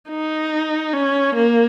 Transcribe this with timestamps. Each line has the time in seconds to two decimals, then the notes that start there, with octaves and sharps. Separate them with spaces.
0.09 D#4
0.93 C#4
1.35 A#3